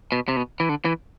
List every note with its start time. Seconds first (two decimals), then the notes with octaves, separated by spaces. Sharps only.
0.12 B2
0.28 C3
0.36 B2
0.60 E3
0.69 D3
0.85 E3